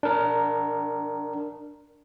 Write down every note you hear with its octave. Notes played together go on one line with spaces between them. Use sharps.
D4 A#4